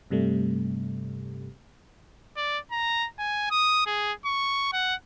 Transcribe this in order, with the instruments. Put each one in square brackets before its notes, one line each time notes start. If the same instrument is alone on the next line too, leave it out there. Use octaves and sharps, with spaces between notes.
[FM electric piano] G2 C3 G3 A3
[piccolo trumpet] D5
A#5
G#5
D#6
G#4
C#6
F#5